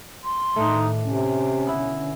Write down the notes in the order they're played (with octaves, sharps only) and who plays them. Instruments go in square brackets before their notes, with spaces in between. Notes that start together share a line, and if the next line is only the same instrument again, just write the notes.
[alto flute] C6
[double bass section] A2 D#3 [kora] A3 D4 [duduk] D#4
[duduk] C3 [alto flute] C#4
[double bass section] B2 D3 [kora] B3 E4